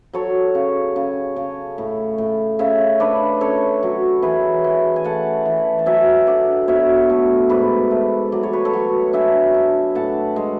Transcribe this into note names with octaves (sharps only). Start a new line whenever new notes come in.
F#3 A4 C#5
C#3
C#3
C#3
A2
A2
C#3 C#5 E5
D4 B4 D5
C#4 A4 C#5
F#3
E3 G#4 B4
E3
G#5
A3 F#5 A5
E3
A5
F#3 E5 G#5
D3 D5 F#5
B2 C#5 E5
A3
G#2 B4 D5
A3
F#3 D5
C#5
B4
A4 C#5
F#3
D4 E5 G#5
D4
A2 F#5 A5
G#3